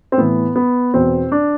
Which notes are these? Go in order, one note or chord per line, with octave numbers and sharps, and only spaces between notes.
C4
A2 E3 B3
B3
E2 B2 C4
D4